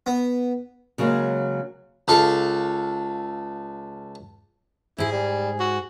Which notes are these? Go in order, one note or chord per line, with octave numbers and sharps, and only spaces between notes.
B3
C#3 F#3 G#3 A#3 C#4
C#2 A4 F5
G#2 E4 G#4
G3
F#4